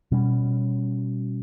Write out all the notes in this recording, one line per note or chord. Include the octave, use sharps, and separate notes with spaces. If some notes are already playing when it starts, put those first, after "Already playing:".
B2 G3 C#4